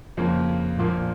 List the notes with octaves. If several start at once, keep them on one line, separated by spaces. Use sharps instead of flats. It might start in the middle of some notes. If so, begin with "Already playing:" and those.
F2 C#3 F3 A#3
A#1 A#2 F3 A#3